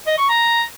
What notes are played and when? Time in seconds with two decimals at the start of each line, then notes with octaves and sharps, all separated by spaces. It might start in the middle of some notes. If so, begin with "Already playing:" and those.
0.07 D#5
0.18 C#6
0.29 A#5